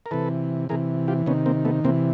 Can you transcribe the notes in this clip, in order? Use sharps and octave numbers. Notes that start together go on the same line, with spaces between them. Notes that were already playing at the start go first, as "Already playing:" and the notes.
A#4
C3 E3 A4 B4
C3 E3 G#4 A#4
F4 G4
C3 D#3 B3 C#4
A#3 C4
A3 B3
C3 E3 A#3 C4